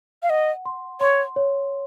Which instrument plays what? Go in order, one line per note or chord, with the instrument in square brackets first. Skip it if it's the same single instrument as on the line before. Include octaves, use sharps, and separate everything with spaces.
[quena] F5
[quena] D#5 [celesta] F#5
[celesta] C6
[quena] C#5 [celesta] C6
[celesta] C#5